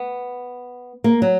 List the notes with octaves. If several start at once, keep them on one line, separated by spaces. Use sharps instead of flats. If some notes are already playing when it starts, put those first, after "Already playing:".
Already playing: B3
A#3
F#3